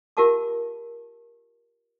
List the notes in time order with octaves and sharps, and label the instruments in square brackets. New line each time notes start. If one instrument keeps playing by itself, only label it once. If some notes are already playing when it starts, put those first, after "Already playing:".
[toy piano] F4 G4 A#4 F5 A5 D6